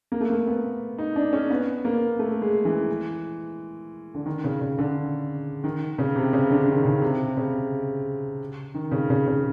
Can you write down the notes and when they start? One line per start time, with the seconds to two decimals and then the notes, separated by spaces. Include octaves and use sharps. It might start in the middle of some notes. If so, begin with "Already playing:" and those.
0.12 A#3
0.21 A3
0.30 A#3
0.47 B3
0.98 D#4
1.16 D4
1.33 C#4
1.50 B3
1.85 A#3
2.19 A3
2.42 G#3
2.65 E3
4.15 D3
4.26 D#3
4.44 C#3
4.61 C#3
4.79 D3
5.64 D#3
5.98 C#3
6.16 C3
6.33 C#3
6.51 D3
6.68 D#3
6.85 C#3
7.02 C3
7.37 C#3
8.74 D#3
8.91 C#3
9.10 C#3
9.27 C#3